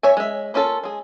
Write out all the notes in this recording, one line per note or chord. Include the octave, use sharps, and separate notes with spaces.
C#5 E5 G#5
G#3 E5
A#3 C#4 F4 A4
G#3 G#4